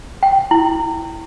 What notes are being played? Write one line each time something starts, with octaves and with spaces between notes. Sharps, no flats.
G5
E4